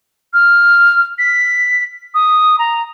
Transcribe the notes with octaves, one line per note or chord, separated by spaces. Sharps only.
F6
B6
D#6
A#5